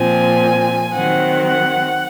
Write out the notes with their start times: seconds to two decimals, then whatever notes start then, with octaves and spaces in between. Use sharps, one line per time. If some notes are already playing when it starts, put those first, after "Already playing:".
Already playing: A#2 F3 C4 G#5
0.95 D#3 F#3 C4 F#5
1.47 F#5